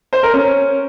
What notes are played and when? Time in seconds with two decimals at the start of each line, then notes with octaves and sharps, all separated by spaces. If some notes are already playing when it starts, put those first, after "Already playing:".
0.13 C5
0.23 A#4
0.33 C#4